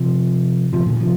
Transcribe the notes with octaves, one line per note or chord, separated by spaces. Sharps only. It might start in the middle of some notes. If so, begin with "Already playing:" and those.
Already playing: C3 F3
C3 F3
A#2 D3
C3 F3